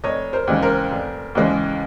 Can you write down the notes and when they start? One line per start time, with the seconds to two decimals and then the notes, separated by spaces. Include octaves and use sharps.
0.04 F1 C#5 D#5
0.33 A#4 C5
0.47 D#2 C#3 E3 G#3
0.62 A#4 C5
0.92 F1
1.35 D#2 C#3 E3 G#3